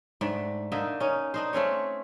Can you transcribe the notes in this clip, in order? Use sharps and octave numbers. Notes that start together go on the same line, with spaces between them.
G#2 A3 D4 G5
D3 A#3 D#4 E5
C#4 D#4
D4 D#4 C5
A3 C4 C#4 C#5